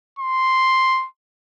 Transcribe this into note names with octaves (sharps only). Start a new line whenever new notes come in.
C6